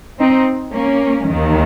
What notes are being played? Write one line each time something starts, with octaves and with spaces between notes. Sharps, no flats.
C4 D#4
A#3 C#4
D#2 D#3